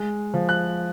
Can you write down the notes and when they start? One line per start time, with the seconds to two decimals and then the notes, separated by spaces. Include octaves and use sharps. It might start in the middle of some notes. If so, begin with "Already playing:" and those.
Already playing: G#3
0.34 F3
0.49 F#6